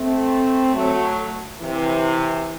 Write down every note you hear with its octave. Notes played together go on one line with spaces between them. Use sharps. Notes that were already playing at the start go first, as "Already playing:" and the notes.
Already playing: A3 C4
F#3 A3
C3 E3